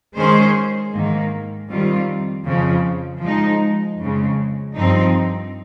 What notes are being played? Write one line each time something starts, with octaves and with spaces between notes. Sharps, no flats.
D#3 G#3 C#4 G#4 C5
G#2 D#3 A#3
F2 D#3 G3 C4 F4
F2 C#3 F3
F3 G#3 D#4
F2 C#3 G#3
G2 F3 C4 D#4